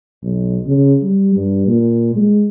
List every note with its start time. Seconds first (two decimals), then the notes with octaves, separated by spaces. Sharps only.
0.23 B1
0.67 C#3
1.03 G3
1.36 G2
1.67 A#2
2.16 G#3